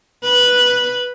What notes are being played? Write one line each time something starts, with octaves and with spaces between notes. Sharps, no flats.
B4